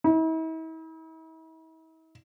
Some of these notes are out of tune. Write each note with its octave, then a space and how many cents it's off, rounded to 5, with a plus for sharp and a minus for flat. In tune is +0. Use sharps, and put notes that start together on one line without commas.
E4 -45